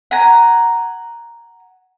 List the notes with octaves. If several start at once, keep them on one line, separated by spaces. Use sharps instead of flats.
F#5 G#5 A#5